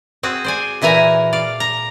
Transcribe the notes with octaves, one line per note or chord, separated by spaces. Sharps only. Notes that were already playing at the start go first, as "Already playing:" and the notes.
C4 F#4 G#4
C5 D5 G#5
A#2 E3 E4 G#5 A#5
D5 F5
A#5